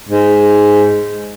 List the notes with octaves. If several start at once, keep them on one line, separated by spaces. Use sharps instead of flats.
G#2